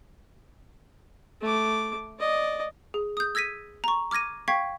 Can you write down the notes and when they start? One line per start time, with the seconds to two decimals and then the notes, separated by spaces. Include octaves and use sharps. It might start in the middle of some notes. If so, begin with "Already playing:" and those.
1.41 A3 D6
2.20 D5 D#5
2.94 G#4
3.17 D#6 G6
3.35 E6 G#6 A#6 B6 D#7
3.84 A#5 C#6
4.11 D6 F6 G#6 A#6 D#7
4.48 F5 G5 C#6 G#6 B6